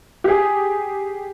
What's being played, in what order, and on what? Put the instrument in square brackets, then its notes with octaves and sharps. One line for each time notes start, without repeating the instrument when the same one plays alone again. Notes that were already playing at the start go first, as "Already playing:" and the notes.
[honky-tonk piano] G4 G#4